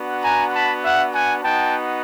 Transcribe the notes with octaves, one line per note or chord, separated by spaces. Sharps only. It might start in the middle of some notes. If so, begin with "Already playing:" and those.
Already playing: B3 D4 F#4
G#5 A#5
A5 B5
E5 F#5
F#5 G#5
B3 D#4 F#4 G5 A5